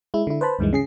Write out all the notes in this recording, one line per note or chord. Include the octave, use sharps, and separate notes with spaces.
G#3 E4
D3 E4
B4 C5 A5 B5
D2 G2 D#3 E3 G#3
C#3 G#4 C7